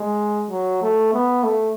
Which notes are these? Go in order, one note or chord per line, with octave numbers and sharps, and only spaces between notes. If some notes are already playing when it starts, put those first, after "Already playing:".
Already playing: G#3
F#3
A3
B3
A3